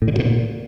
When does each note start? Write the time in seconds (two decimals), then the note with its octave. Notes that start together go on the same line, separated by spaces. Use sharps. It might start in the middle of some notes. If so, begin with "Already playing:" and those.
0.02 A2
0.08 D3
0.13 A2
0.19 B2
0.25 A#2